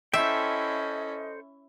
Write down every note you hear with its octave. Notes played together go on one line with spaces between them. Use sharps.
C#4 E4 A4 C5 D#5 E5 G5